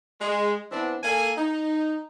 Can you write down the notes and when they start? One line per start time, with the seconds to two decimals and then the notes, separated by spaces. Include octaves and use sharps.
0.20 G#3
0.71 E3 B3 C4 D4
1.03 A#3 A4 G#5
1.37 D#4